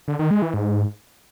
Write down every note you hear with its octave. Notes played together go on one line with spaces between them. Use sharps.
D3
D#3
G#3
E3
G#2